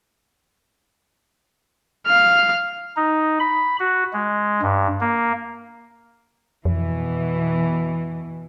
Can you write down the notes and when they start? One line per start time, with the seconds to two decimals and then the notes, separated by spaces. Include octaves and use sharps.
2.07 F5 F6
2.96 D#4
3.40 B5
3.79 F#4
4.13 G#3
4.62 G2
5.01 A#3
6.65 F2 B2 E3